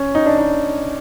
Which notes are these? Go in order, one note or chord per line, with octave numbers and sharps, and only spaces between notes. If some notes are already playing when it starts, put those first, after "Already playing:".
Already playing: C#4
D#4
D4
D#4